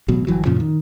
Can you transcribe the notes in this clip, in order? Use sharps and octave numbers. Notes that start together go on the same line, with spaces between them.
A1 B2 F#3
G1 D2 E3 F#3
F#2 A#2 C#3 F3
D#3